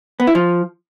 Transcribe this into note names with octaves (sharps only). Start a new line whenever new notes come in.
B3
E4
F3